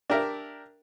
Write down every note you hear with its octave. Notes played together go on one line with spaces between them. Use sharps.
D4 G4 A#4 E5